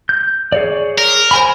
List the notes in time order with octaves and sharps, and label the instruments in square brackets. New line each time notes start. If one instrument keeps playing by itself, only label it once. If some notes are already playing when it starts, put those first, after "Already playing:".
[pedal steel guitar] G6
G#4 C#5 D5
[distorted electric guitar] A#4
[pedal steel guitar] C5 G#5 B5